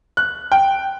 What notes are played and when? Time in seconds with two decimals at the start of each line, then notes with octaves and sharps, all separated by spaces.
0.17 F#6
0.52 G5